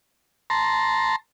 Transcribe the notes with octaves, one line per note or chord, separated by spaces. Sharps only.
A5 A#5 C6